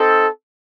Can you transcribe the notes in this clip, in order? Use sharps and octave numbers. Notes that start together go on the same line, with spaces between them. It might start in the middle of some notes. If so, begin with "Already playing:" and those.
Already playing: C4 D#4 A4